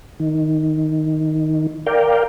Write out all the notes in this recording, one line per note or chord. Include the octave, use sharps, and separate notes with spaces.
D#3
A#4 D5 F5 G5